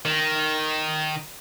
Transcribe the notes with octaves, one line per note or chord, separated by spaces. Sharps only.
D#3